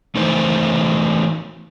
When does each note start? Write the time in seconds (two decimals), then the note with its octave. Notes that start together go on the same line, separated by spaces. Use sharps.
0.15 E3 A3 D#4 C5